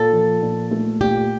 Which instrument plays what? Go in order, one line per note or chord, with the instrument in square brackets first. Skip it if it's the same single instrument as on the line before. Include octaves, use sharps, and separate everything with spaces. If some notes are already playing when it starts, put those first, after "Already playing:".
Already playing: [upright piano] A#2 [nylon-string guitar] A4
[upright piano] F3
A#2
A3
[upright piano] A#2 [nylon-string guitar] G4